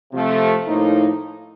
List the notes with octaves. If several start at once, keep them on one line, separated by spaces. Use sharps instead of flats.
C3 F3 A3
A2 F3 A#3 D#4